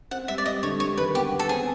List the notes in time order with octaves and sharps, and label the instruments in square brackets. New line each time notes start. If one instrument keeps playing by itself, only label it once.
[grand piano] C4 [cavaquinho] F#5
[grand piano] G3 [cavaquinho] E5
[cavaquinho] D5
[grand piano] G3 [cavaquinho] D#5
[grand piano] D3 [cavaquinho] C#5
[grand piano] G3 [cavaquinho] C#5
[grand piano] D#3 [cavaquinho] B4
[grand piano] B3 [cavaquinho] G4
[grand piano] B3
[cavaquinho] A4
[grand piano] C4 [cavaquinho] G#4